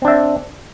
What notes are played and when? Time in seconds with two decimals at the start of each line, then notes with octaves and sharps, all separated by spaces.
0.02 C4
0.05 D4
0.08 E5